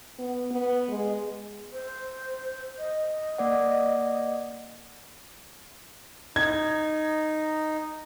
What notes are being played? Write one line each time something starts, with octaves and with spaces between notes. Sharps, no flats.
B3
B3
G#3
C5
D#5
A#3 D5 F#5
D#4 G#6